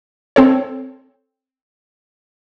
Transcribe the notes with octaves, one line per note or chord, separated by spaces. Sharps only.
C4 A4 C#5